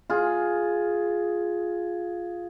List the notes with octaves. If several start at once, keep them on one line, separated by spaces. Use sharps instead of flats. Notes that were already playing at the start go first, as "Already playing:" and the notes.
F4 G#4